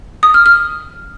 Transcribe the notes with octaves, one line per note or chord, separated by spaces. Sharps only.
D#6
F6
F6